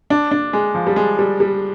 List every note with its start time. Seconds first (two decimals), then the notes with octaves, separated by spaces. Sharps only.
0.10 D4
0.31 D4
0.53 G#3
0.75 F3
0.87 G3
0.96 G#3
1.19 G3
1.40 G3